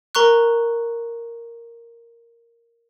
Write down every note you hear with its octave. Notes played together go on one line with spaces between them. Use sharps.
A#4 A#5 C#6 F#6